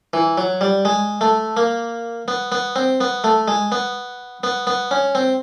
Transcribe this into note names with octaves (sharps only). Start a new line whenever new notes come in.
E3
F#3
G3
G#3
A3
A#3
B3
B3
C4
B3
A3
G#3
B3
B3
B3
C#4
C4